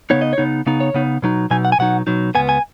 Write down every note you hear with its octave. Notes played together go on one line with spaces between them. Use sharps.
C#3 B3 D#4 C#5
D#5
C#5
C#3 B3 D#4
C#3 B3 D#4
C#5
C#3 B3 D#4
B2 F#3 D#4
B2 F#3 D#4 G#5
F#5
G#5
B2 F#3 D#4 F#5
B2 F#3 D#4
C#2 B2 B3 G#5
G#5